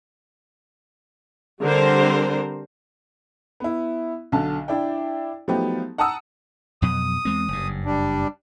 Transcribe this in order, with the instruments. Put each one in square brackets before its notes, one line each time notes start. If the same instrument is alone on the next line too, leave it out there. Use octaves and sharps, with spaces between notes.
[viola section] D3 G3 C4 A#4 C5
[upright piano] B3 E4
B1 D3 A5
D4 E4 D5 G5
F3 F#3 A3 B3 D#4 G4
F#5 A5 A#5 D#6 E6
[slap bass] F2 B2 F#3 [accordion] D#6
[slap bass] E2 G#3 C4
F#1 G2
[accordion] G3 D4